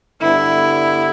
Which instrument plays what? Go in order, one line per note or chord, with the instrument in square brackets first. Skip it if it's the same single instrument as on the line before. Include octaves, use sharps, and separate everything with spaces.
[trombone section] G2 D3 G3 B3 [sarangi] E4